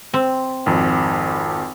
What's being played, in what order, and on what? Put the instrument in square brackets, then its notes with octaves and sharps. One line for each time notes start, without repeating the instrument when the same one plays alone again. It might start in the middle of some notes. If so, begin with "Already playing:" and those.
[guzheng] C4
[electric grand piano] G#1 F2